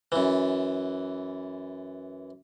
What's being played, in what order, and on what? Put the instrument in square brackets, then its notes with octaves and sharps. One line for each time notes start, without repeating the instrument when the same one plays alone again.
[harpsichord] F#2 E3